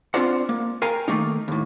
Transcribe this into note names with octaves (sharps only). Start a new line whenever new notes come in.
C4 D4 F4 C5 D5 F#5
A#3
A#4 F5 G5 G#5 A#5
D#3 F#3 A3 A#3 D#4
D#2 A2